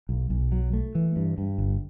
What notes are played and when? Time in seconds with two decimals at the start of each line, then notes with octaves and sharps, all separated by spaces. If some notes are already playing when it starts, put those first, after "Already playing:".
0.09 B1
0.30 B1
0.52 F#3
0.73 A3
0.95 E3
1.16 G2
1.38 G2
1.58 G1